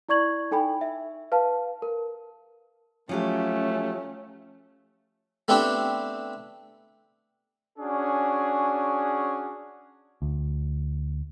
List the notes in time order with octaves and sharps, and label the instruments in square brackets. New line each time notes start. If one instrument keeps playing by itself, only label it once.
[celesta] E4 D5 C#6 G#6 F#7
D#4 A4 G5 G#5 B5
E5
B4 F5 A5
A#4
[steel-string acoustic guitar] F3 F#3 G4 [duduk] A3 [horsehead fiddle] C#4
[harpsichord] A3 B3 C4 D4 G4
[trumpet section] C#4 D4 F#4 G#4
[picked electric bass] D2